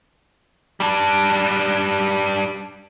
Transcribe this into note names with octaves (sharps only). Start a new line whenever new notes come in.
G3 D4